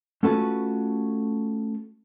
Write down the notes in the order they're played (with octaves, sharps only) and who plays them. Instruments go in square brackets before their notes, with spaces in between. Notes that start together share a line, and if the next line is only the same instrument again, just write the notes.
[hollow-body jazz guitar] A3 C#4 F4 F#4 A4 B4